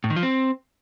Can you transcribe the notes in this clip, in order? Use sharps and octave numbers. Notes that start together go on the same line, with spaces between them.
A2
D#3
F3
C4